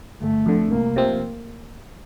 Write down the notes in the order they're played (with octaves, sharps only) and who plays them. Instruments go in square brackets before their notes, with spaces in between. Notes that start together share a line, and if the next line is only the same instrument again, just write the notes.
[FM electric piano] G1 [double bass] A3
[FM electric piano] F2 D3
[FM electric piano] C2 [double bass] A#3
[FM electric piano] C3 F3 C4